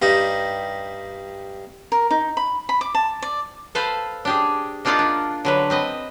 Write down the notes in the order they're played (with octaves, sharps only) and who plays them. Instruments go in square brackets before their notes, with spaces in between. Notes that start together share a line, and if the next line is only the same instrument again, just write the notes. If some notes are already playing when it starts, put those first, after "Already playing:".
[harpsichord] G2 G3 D#4
[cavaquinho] A#4
D#4
B5
B5
D6
A5
D5
[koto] A4 B4 C5 F5
D4 G4 G#4
A#3 D4 D#4 F4 D5 F#5
D4
D3 F#3 B4
C4 B4 D#5